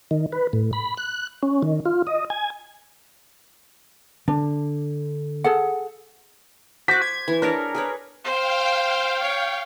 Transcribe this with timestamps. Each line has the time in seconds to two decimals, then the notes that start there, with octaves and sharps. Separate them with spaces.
0.11 D#3
0.32 B4
0.53 A2
0.73 B5
0.97 F#6
1.43 C#4
1.63 D#3
1.86 F4
2.07 D#5
2.30 G#5
4.28 D3 D4
5.44 G#4 A4 F#5
6.88 F#4 C5 D6 B6
7.02 G#6
7.28 E3
7.42 D4 G#4 A#4 C#5
7.75 G#4 B4 C#5
8.25 C5 F5 G5
9.23 C#5